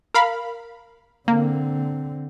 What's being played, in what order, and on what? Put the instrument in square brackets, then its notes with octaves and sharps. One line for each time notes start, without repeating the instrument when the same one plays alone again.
[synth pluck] A#4 F5 B5
[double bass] D3 C4 [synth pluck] A#3